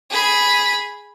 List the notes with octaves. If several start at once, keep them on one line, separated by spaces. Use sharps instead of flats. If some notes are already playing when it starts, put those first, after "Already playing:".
G#4 B5